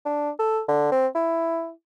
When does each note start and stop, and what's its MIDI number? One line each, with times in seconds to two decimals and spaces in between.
0.05 0.30 62
0.39 0.60 69
0.68 0.90 50
0.92 1.07 60
1.15 1.71 64